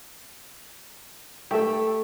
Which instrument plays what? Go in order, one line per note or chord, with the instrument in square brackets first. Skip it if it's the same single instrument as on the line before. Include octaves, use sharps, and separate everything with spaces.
[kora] A3 E5 [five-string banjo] G4 A4